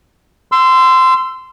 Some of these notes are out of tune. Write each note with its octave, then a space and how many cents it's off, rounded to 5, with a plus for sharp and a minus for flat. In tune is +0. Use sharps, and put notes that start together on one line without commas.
C6 -15 E6 +20